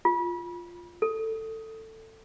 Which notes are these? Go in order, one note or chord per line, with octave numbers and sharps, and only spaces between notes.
F4
A4